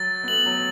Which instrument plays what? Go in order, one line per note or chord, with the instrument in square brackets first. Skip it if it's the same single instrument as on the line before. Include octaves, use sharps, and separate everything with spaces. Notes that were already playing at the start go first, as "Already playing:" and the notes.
Already playing: [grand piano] F#3 [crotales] A6
[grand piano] B3
[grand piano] A3 [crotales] F#7
[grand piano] F#3